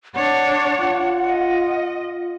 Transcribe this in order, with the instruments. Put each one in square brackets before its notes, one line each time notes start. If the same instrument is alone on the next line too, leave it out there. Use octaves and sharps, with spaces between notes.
[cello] D4 C#5 [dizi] F#5
[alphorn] F4
[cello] D#5